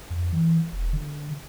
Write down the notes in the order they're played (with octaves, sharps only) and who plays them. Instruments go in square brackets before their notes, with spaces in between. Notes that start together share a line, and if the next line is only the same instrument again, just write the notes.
[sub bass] F2
E3
E1
D3